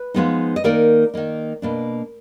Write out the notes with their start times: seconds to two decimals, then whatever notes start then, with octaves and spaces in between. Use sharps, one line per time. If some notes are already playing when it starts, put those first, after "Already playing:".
Already playing: B4
0.14 F3 G#3 B3 D#4
0.56 D#5
0.64 D#3 A#3 D#4 A#4 D5
1.14 D#3 A#3 D#4
1.62 B2 A#3 D4